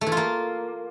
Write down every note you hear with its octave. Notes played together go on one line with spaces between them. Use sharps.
A3
E3
F4
A#3